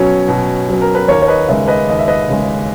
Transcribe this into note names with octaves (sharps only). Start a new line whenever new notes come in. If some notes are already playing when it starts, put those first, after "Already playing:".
Already playing: B2 F#3 C#4
B2
F#3 C#4
A#4
B4
D#2 A#4 C#5
C#5
B4 D#5
C#3 G#3 C#5 E5
B4 D#5
D#2 D#5
E5
B4 D#5
C#3 G#3